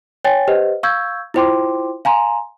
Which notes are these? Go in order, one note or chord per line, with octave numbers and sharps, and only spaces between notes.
C#5 G5 G#5 A6
G4 B4 C5 D#5 F#5
F5 C#6 E6 G6 G#6
E4 F4 C5 G5 C6 D6
F5 G#5 A#5 C6